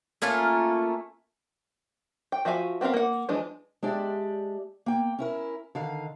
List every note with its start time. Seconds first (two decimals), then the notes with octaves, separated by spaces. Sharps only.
0.22 A3 A#3 C#4 F4
2.32 G5
2.45 F3 F#4 E5 F5 G#5
2.81 B3 C4 F4 A#4 F5
2.94 A#3 F#5
3.29 E3 F3 G#3 D4
3.83 G#3 D4 G4 D5 E5
4.86 A#3 G5
5.19 C#4 E4 A#4
5.75 D3 D#3 F5